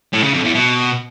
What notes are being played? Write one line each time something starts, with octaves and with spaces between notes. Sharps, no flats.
A2
C#3
F2
E2
B2